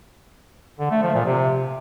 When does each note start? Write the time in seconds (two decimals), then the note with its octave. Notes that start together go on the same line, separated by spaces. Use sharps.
0.80 D3
0.91 A3
1.03 F3
1.14 A#2
1.26 C3